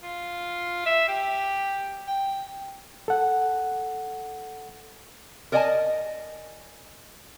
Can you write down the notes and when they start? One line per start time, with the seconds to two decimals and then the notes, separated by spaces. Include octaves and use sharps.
0.03 F4
0.86 E5
1.08 G4
2.07 G5
3.08 A4 F#5
5.52 A#4 D5 D#5 F#5 G#5 A5